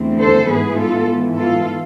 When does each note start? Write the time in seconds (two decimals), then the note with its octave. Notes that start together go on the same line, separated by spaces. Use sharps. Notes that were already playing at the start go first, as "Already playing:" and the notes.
Already playing: E2 D3 A3 C4
0.19 A4 C5
0.48 G#2 E3 B3 G#4 B4
0.78 F4 A4
1.08 G#2 E3 B3
1.38 F4 A4